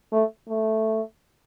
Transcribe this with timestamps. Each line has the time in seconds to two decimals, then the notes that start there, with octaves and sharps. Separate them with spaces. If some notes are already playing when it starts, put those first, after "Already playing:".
0.12 A3
0.48 A3